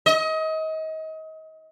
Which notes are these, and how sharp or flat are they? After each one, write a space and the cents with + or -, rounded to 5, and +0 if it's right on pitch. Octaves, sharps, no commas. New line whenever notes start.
D#5 +30